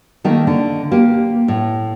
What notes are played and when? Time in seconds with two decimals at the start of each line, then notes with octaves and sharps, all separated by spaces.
0.24 D#3 A3 A#3 D#4
0.47 D3
0.91 A#3 G4
1.48 A2